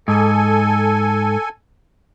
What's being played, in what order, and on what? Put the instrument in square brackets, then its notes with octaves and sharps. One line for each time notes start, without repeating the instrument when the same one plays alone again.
[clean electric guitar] G#2 [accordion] A4 G#5